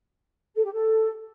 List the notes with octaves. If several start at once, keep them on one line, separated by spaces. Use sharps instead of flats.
A4
G4
A4